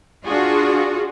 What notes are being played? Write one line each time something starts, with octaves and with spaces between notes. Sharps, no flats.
D4 F4 F#4 G#4